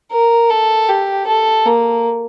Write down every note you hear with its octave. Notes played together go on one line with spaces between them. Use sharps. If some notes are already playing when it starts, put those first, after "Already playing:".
A#4
A4
G4
A4
A#3